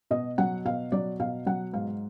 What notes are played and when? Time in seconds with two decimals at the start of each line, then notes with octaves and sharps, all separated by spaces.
0.11 B2 D#5
0.38 F#3 F#5
0.65 B2 F5
0.92 F#3 D5
1.20 B2 F5
1.46 F#3 F#5
1.73 G#2 F5